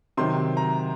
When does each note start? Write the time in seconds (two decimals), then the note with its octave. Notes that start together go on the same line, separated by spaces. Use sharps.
0.17 C3 D#3 F#3 C6
0.57 A#5